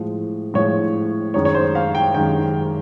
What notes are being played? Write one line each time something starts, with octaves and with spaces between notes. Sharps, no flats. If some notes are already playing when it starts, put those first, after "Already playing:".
Already playing: A2 F3 G#3
A2 F3 G#3 C#5
F#2 D#3 G#3 C#5
C#5
C5
F5
G5
F#2 D#3 G#3 G5